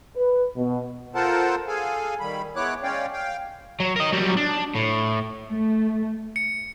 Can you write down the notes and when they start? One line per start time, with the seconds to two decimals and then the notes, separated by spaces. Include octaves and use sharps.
0.16 B4
0.57 B2
1.15 F4 A4 A#4 C5 F#5 A5
1.68 G#4 A4 F5 G#5
2.20 D#3 G3 B5
2.56 G#3 B3 E4 C#5 D6 F#6
2.83 G#3 C#4 C#5 D5 F5 G5
3.13 F5 G5
3.80 F#3
3.96 A#4 D#5
4.12 F#3 G3
4.37 D4
4.76 A2
5.50 A3
6.36 C#7